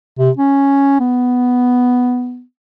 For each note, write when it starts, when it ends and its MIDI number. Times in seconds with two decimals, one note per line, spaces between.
0.19 0.30 48
0.37 0.99 61
1.00 2.42 59